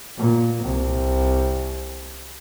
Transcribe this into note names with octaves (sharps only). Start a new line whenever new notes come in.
A#2
C2